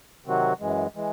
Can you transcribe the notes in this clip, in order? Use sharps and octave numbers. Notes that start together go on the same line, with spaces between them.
C3 D#3 F#3 C4 F#4
F#2 E3 G#3
E3 G#3